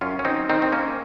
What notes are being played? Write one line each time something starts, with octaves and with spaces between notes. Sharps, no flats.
F#2 C#4 F4
C#4
C4 D#4
D#3 C4 D#4
C4
A#3 C#4